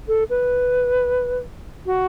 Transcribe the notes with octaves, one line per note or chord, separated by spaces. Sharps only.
A4
B4
F#4